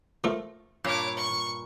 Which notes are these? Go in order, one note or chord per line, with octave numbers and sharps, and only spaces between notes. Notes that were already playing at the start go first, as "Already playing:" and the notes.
F3 A3 A#4
G2 A#2 C#5 D6
C#6